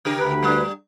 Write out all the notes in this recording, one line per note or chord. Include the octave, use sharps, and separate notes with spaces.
C#3 G4 A#4
D2 D3 B4
G3 D4